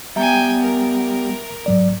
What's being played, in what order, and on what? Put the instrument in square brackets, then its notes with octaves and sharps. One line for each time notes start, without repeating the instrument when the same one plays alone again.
[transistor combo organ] G3 [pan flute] B3 [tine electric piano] E5 A#5 [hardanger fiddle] G5 G#5
[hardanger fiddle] A#4
[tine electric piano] G#2 F#3 D5